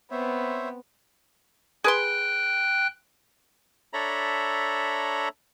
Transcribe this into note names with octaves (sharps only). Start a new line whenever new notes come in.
B3 C4 C5 C#5 E5
G#4 B4 G5 C6 F#6
D4 A4 C#5 E5 A#5 B5